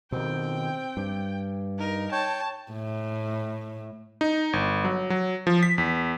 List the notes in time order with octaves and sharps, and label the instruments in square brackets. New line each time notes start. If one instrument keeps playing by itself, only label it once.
[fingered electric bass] B2 D#3 [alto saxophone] C4 [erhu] G5
[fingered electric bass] G2
[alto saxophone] D#4 [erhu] A#4
[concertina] C#5 G5 [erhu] A5
[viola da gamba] A2
[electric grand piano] D#4
G1
F#3
F#3
F3
B6
E2